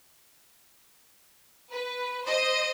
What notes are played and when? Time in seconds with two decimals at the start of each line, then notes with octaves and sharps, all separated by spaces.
1.72 B4
2.25 C5 D#5